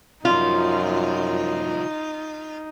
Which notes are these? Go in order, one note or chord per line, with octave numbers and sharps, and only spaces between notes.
C2 F#2 F3 D#4 F4